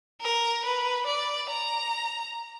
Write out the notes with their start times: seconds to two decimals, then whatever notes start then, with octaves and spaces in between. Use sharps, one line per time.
0.21 A#4
0.64 B4
1.06 D5
1.49 A#5